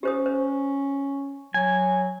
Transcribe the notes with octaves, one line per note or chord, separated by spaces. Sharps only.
C#4 G4 C5 D#6
C5
F#3 G#5